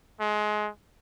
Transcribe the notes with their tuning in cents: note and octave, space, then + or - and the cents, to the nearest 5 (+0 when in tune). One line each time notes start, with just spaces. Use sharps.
G#3 +25